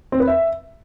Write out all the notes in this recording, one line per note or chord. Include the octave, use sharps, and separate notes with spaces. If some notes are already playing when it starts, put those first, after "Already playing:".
C4
B4
E5